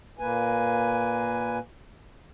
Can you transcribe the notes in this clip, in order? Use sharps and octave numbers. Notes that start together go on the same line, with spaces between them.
A#2 A#3 B4 G#5